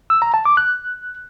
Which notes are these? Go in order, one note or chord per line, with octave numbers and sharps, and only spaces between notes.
E6
A#5
A5
D6
F#6